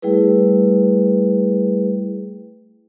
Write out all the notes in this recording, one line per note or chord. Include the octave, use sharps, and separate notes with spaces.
G3 A3 E4 G#4 B4